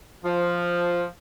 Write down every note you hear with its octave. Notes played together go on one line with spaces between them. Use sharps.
F3